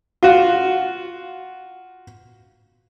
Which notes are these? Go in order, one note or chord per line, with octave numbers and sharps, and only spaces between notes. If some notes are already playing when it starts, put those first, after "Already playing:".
F4 F#4